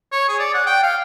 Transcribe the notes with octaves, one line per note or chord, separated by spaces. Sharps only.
C#5
G#4
D5
F#5
G5
F5